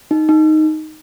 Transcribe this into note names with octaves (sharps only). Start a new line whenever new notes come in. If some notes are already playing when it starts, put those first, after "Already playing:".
D#4
D#4